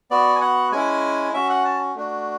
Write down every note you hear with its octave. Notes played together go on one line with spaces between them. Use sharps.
B3 F#4 D5
G#5
F#5
G#3 C#4 E4 G#5
C#4 F#4 E5
F#5
A5
A3 D4 F#4